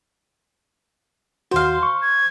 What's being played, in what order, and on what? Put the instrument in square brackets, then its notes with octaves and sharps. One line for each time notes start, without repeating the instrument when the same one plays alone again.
[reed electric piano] D#2 F#4 [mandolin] C5 F5
[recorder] C6
[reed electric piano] C#6
[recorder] G#6